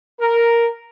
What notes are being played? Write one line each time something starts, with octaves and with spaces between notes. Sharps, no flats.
A#4